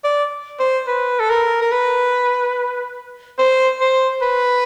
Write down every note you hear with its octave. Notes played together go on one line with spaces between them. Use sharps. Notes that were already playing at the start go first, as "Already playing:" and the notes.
D5
C5
B4
A4
A#4
A#4
B4
C5
C5
B4